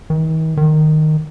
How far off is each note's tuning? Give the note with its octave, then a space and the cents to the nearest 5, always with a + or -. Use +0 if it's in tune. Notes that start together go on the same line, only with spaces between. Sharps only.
D#3 +45
D#3 -10